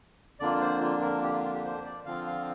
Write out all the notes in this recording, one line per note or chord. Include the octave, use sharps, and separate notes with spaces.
F2 D3 A#3 D4 F4 D5
C5
F4
A#4
G4
F4
F4
G4
C5
D5
D3 F3 C4 F4 F5
F5